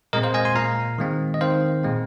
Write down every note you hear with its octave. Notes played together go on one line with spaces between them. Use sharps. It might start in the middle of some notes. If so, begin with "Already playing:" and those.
A#2 G#3 C4 A#4 D#5
C5 F5
D#5 G#5
G#5 C6
A#2 A#3 F5 A#5
D#3 G#3 C4
D#5
D#3 C4 C5 F5
A#2 G#3 C4